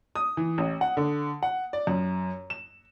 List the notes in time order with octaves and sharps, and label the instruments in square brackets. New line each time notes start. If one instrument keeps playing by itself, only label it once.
[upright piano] D#6
E3
A1
F#5
D3
F#5
D5
F#2
E7